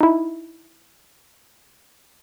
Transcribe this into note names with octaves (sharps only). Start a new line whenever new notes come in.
D#4 E4